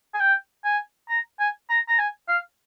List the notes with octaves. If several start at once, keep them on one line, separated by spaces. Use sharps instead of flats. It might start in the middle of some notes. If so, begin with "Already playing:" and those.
G#5
G5
G#5
A#5
G#5
A#5
A#5
G#5
F5